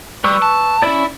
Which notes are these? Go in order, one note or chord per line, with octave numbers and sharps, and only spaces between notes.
G3 B4 C#6 E6
A5
C#4 E4 D5